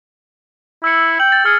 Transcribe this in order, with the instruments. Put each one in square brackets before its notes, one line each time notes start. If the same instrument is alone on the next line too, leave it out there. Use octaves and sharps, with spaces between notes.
[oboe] E4 [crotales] E6 C#7
[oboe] G5 [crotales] F#7
[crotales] A6
[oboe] G#4 [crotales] F6 C#7